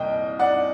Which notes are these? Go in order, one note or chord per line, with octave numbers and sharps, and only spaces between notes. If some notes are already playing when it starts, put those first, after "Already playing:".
Already playing: C2 A#2 D#5 G5
D5 F#5